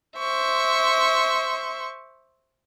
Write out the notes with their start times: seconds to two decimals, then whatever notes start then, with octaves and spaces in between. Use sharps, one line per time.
0.18 C5 E5 C#6